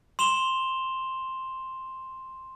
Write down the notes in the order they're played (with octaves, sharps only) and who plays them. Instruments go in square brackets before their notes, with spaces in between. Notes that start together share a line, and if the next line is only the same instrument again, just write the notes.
[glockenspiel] C6 E7 F7 G7